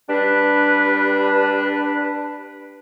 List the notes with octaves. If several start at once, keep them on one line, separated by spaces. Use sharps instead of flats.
G3 D4 B4